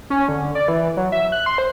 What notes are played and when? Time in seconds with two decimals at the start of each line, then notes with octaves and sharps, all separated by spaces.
0.10 C#4
0.28 D3
0.55 D5
0.68 E3
0.97 F#3
1.12 E5
1.32 F#6
1.46 C6
1.58 C5